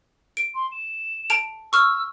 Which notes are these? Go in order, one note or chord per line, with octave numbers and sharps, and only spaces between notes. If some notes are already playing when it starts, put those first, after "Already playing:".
D7
C6
E7
A5 D7 F7
C#6 E6 F6